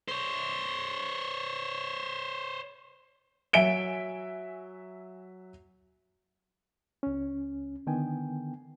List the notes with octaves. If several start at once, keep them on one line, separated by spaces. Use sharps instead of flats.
C5 C#5
F#3 E5 G#5 D7 G7
C#2 C#4
D3 D#3 B3 G5 G#5